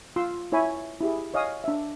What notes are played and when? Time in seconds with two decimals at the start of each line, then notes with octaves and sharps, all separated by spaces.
0.16 F4 C6 E6
0.52 E4 C#5 E5 G#5 B5
1.01 E4 G4 G#4
1.34 C#5 D#5 F5 G#5 D#6
1.64 D4 E5